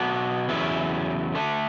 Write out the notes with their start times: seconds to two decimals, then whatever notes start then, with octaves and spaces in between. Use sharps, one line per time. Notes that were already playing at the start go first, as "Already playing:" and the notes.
Already playing: B2 F#3 B3 D4
0.48 E2 C#3 F#3 C#4 E4
1.34 D3 A3 D4